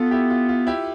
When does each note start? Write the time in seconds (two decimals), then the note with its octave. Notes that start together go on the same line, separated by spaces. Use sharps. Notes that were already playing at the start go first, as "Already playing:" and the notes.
Already playing: B3 F4 A4
0.11 E4 G4
0.30 F4
0.49 F4
0.67 E4 G4